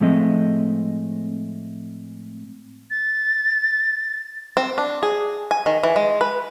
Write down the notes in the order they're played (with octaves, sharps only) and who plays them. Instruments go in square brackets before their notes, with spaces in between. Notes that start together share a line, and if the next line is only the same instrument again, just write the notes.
[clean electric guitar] A2 F3 G#3 A3 C4 D#5
[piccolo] A6
[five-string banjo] C4
D4
G#4
G#5
D#3
E3
G#3
B4